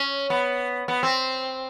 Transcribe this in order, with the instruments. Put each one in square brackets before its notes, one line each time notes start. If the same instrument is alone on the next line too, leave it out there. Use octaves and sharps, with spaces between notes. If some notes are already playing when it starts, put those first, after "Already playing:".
Already playing: [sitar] C#4
B3
B3
C4